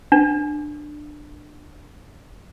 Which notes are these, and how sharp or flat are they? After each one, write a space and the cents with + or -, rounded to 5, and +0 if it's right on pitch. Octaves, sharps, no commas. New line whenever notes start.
D4 +20